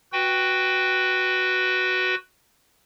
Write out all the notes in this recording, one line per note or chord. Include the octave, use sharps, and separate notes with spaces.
F#4 B4 G5